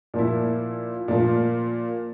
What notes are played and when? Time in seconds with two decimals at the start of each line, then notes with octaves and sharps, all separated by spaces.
0.14 A#2 F3 A#3 E4
1.08 A#2 F3 A#3 F4